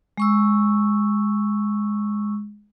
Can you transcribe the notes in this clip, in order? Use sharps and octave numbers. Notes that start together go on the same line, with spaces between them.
G#3 C#6 E6